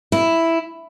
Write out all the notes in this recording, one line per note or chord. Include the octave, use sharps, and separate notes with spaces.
E4